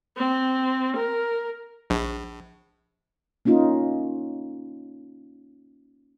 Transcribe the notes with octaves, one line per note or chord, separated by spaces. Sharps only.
C4
A#4
A#1
A#3 C#4 D#4 F4